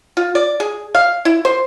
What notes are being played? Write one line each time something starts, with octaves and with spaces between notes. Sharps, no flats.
F4
D5
G#4
F5
E4
C5